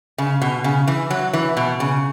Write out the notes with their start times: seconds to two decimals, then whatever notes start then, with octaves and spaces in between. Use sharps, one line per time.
0.18 C#3
0.42 B2
0.64 C#3
0.88 E3
1.10 F#3
1.33 E3
1.57 B2
1.80 C#3